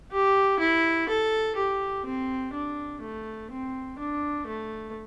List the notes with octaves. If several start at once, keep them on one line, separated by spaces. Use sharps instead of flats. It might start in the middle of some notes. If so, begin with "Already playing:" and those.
G4
E4
A4
G4
C4
D4
A3
C4
D4
A3